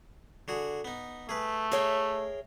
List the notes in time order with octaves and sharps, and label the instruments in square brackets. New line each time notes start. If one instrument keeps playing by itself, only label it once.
[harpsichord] D3 F#4 G#4
B3 D#4
[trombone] A3 [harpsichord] G#4 B4
[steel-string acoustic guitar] G#4 C#5 E5 [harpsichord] A#4 F5 G5